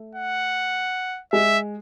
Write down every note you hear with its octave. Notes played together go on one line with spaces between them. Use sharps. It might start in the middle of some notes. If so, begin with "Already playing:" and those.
Already playing: A3
F#5
G#3 E5